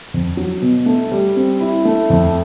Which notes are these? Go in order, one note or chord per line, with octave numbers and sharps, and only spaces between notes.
F2
F#3
B2
A3
G3
C4
E4
A3
F2